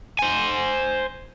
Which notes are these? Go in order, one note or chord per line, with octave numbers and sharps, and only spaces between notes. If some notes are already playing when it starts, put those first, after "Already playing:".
C5 G#5